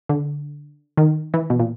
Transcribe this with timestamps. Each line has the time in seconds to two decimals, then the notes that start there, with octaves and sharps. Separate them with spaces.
0.09 D3
0.97 D#3
1.34 E3
1.50 B2
1.59 A#2